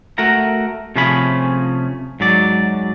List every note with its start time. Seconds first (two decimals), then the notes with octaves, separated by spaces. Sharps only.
0.18 A3 F#4 A#4 A#5
0.96 C3 F3 A3 C#4 G#4 B5
2.20 G#2 F#3 D5